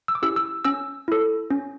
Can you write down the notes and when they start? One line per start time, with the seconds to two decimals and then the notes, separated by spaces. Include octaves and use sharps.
0.08 E6
0.15 D6
0.22 C#4 E4 G4 E6
0.36 E6
0.65 C#4 E6
1.08 E4 A4
1.51 C#4